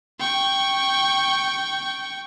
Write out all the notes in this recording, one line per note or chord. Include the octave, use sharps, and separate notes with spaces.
G5 C#6